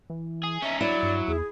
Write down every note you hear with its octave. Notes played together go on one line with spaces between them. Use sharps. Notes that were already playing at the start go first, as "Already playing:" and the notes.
E3
G#4
C#4 D#4 E5
D3 F#3 E4 D5
G2
E2 G#4